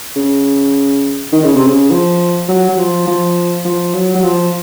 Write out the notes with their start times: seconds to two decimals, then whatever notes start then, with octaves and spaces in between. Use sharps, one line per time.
0.16 C#3
1.33 D#3
1.44 C#3
1.56 C3
1.67 C#3
1.91 F3
2.49 F#3
2.69 F#3
2.78 F3
3.07 F3
3.65 F3
3.94 F#3
4.15 F#3
4.23 F3